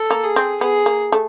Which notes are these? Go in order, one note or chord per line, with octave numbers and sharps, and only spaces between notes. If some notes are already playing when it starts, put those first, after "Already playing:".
Already playing: A4
A#3
G#4
C4
B3 G#4
A#3
A3